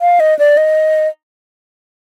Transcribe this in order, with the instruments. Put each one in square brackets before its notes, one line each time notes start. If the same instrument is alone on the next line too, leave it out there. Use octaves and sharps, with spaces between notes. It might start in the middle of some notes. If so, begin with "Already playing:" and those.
[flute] F5
D#5
D5
D#5